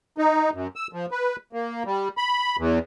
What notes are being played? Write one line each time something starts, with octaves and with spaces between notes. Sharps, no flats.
D#4
F#2
E6
F3
B4
A#3
G3
B5
E2